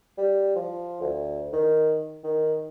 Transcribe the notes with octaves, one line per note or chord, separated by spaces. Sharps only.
G3
F3
D2
D#3
D#3